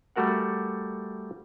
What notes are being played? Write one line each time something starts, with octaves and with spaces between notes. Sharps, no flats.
G3 A3 F#4 A#4 F#5